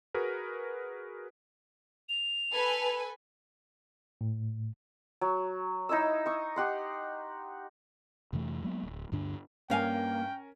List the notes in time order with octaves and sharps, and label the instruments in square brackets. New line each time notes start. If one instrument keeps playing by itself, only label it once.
[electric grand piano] F#4 G#4 A#4 B4
[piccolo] F7
[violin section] A4 B4 G#5
[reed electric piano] A2
[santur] F#3
D#4 E4 D#5 E6
C#6 D#6
G4 F#5 C6
[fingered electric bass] F2 C3 E3 A3
F#3 G#3 A#3 B3
D1
D2 G2 D3 D4
[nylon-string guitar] G2 F5 G#5 [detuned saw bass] A#3 [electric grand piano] C#4 A#4 [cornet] G5